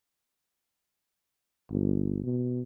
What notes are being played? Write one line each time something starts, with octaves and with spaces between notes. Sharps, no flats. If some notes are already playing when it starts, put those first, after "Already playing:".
G1
B2